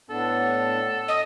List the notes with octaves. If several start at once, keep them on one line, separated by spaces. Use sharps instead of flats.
A2 B3 D4 A4
D#5